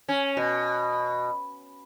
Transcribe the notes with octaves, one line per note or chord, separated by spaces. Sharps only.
C#4
B2